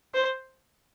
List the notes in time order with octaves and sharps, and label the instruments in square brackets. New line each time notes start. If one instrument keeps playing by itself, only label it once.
[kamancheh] C5